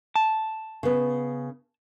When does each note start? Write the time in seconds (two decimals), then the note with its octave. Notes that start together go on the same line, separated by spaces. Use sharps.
0.16 A5
0.83 C#3 B3